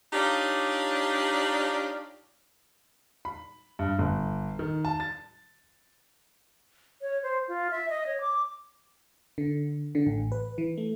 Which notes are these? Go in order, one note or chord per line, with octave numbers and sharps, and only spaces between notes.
D4 D#4 F4 G4 C#5 D5
B5
G2
G1
D#3
A5
A6
C#5
C5
F4
E5
D#5
C#5
D6
D3
D3
A1
B4
E3
A3